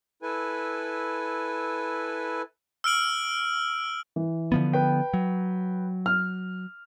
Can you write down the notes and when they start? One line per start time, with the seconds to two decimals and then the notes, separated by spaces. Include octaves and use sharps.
0.23 E4 A4 B4 G#5
2.84 E6 F6 D7 F#7
4.16 E3
4.52 D3 F3 B3
4.73 B4 G5
5.14 F#3
6.06 F6